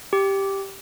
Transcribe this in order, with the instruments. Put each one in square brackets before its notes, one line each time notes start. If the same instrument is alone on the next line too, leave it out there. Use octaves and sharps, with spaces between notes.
[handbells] G4